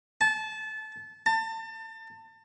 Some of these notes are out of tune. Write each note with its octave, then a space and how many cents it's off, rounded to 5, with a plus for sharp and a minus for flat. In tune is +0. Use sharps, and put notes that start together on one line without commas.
A5 -25
A5 +30